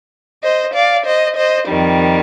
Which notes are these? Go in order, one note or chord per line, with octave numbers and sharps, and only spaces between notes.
C5 D#5
D5 F5
C5 D#5
C5 D#5
F2 D#3 G3